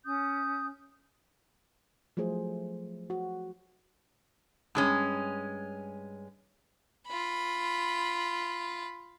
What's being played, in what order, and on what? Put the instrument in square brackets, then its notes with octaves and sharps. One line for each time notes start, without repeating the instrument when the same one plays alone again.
[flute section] C#4 D#6 G6
[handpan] F3 F#3 A3 G#4 C5
F#4
[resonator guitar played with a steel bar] G2 G#3 C#4
[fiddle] F4 B5